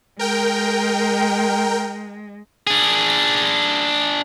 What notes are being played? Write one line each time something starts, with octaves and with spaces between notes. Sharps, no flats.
G#3 A#4 G5
D4 G#4